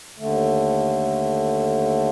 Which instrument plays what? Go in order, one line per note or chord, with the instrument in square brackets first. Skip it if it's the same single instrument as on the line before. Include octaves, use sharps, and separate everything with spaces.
[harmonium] D#2 D3 A3